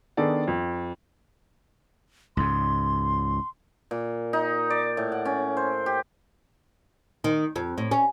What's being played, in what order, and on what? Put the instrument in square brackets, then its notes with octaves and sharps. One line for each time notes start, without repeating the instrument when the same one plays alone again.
[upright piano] D#3 B3 D4 G#4 A4 D5
F2
[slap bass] C#2 G#2 [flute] C6
[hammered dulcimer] A#2
D#4
D5
A2
F#5
C#4
C5
G4
[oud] D#3
F2
A2
C#4